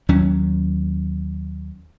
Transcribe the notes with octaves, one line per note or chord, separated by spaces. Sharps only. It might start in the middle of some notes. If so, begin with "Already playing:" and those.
D#2 F#3 C#4